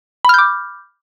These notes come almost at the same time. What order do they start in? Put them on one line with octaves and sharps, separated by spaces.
B5 F6 G6 D6